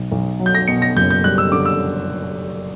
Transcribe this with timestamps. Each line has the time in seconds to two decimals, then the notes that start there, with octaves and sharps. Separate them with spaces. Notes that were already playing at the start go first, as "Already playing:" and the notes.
Already playing: B1
0.12 B1
0.40 F#3
0.46 G6
0.55 A#6
0.68 B2 C#7
0.82 A#6
0.97 F#1 G6
1.11 G6
1.24 G3 F#6
1.38 E6
1.52 D3 D6
1.66 E6